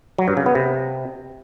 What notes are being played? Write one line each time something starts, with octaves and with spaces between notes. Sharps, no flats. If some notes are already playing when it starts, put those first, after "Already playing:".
F#3
G2
C#3
B3
C3